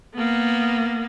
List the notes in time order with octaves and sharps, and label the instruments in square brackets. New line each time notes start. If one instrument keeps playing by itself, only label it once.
[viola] A#3 B3